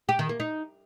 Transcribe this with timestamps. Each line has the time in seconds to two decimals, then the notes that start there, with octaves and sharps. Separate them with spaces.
0.09 G4
0.19 D#3
0.29 A#3
0.40 D#4